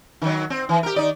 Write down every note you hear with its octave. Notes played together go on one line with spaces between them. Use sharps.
D#3 F#3
C4
E3
G4 A#4
D#3 D#4 D5